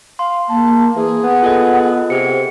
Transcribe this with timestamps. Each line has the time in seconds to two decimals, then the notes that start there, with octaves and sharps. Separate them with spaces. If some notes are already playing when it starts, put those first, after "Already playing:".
0.19 F5 C6
0.49 A#3 A5
0.96 E3 G#4
1.23 B3 F#5
1.42 F4 A4 D#5
2.10 C3 G4 G#4 C5 C#7